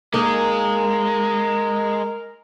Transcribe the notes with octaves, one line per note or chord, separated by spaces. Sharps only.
G#3 A#3 D#4 A#4